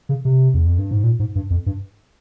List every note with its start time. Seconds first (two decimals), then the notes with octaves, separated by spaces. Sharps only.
0.09 C#3
0.25 C3
0.54 E2
0.66 F2
0.78 G2
0.91 G#2
1.04 A#2
1.19 G#2
1.35 G2
1.50 F2
1.66 G2